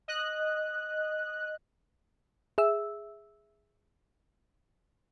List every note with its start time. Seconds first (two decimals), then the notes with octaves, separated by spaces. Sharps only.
0.08 D#5 F#6
2.58 G#4 E5 E6